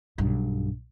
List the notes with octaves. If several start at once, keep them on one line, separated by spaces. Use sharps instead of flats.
B1 G2